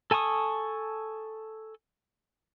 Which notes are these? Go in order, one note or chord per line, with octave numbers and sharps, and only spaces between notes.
A4 G#5 A5 C#6 D#6